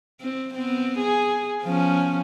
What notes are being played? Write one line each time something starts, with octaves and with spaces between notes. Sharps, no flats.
C4
B3 C4
G#4
F3 B3 C#4